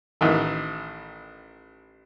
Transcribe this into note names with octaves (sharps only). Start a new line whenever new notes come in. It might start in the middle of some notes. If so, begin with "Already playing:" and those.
A1 D#3 E3